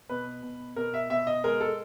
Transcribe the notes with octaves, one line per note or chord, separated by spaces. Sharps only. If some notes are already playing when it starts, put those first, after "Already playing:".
B2 B4
B2
B2 A#4
E5
B2 E5
D#5
G#3 A#4
A4